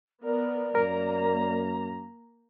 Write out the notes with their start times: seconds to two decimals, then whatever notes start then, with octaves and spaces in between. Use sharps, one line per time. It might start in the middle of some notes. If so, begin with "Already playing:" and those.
0.24 B3 A#4 D5
0.75 F#2 A#3 A#4 A#5